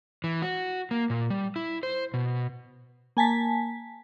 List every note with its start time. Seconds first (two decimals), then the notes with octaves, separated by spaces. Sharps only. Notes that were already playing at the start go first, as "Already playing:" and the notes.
0.24 E3
0.42 F#4
0.91 A#3
1.10 A#2
1.30 G3
1.56 E4
1.83 C5
2.14 B2
3.17 A#3 G#5 A5 B6